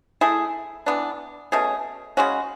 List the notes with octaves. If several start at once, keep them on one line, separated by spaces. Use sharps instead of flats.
A3 E4 G#4
E3 B3 D4
B2 A3 C#4 G#4
C#3 G#3 C#4 F#4